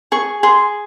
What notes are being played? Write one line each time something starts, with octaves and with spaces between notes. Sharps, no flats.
G#4 C#6
G#4 C6